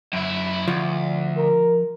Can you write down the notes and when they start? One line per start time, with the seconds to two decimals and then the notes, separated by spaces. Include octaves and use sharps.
0.13 F#2 E4
0.68 D2 F3
1.37 A#4